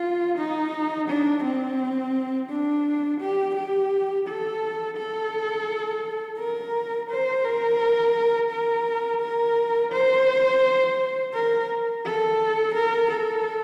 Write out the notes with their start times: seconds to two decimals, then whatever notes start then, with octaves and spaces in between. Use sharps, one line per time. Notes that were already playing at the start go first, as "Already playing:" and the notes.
Already playing: F4
0.38 D#4
1.08 D4
1.44 C4
2.50 D4
3.21 G4
3.56 G4
4.27 A4
4.97 A4
6.39 A#4
7.10 C5
7.45 A#4
8.51 A#4
9.21 A#4
9.93 C5
11.34 A#4
12.05 A4
12.75 A#4
13.11 A4